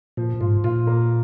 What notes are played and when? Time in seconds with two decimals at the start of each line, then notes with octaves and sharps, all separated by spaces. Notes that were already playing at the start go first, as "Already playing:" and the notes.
0.17 A#2 F3
0.41 G#2 F4
0.64 A#2 F4
0.87 A#3